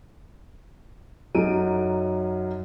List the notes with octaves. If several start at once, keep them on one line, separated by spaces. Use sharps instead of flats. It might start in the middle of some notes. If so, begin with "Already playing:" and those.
F#2 F#3 D#4 A4 D7 D#7